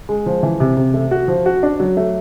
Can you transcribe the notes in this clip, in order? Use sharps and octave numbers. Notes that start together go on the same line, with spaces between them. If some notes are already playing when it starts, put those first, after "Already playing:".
G#3
F3
E3
C3
C3
A3
F#4
F3
F#4
D4
F#3
A3